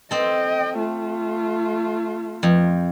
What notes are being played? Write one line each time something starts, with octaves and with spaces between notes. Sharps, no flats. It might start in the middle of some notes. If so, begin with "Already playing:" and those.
C4 A4 D#5 G5
A3 F4
F2